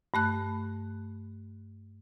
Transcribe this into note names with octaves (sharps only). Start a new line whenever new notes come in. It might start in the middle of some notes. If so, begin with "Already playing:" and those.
G2 A3 F#6